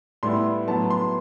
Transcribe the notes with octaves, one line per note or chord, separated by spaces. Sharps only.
A2 G3 B3 E4 C6
A2 F#3 B3 A5
C6